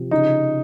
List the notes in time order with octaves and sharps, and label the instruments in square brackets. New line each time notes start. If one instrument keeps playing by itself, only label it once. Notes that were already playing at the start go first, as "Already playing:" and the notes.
Already playing: [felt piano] C3 F3
[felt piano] C#3 [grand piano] D#4